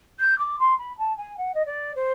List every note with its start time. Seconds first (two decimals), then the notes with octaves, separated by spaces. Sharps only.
0.20 G6
0.39 D6
0.59 C6
0.78 B5
0.98 A5
1.17 G#5
1.37 F#5
1.54 D#5
1.66 D5
1.95 C5